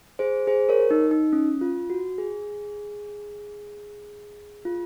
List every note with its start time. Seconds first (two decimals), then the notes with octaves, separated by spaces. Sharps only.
0.19 G#4 C5
0.47 G#4 C5
0.69 A#4 C#5
0.91 D#4
1.11 D#4
1.33 C#4
1.61 F4
1.90 F#4
2.18 G#4
4.65 F4